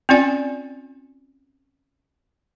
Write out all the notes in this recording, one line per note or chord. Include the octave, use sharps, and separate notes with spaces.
C4 C#4 F4 D5 G#5